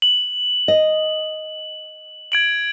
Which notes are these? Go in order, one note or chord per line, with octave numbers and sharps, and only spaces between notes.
F#7
D#5
G#6 D7 F#7